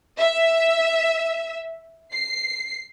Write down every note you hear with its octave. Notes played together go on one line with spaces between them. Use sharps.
E5
C7